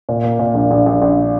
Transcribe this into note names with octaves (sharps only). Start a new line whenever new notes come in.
A#2
A#3
A#2
A#1
A#1
A#1
A#1